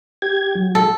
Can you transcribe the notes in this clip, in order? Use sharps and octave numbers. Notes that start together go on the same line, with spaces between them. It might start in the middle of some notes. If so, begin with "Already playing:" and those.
G4 G#6
F#3
A4